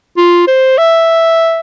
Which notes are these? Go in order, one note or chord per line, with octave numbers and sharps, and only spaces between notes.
F4
C5
E5